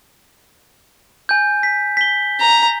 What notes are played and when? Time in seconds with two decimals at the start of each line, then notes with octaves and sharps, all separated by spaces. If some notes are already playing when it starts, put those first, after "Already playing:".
1.29 G#5 G6
1.63 B6
1.97 B6 G7
2.39 A#5